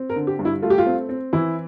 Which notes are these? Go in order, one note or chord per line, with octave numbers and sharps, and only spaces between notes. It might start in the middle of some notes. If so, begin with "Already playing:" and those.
Already playing: C4
A#4
D3
G4
G2
E4
A3 F4
G4
F4
C4
C4
E3 E4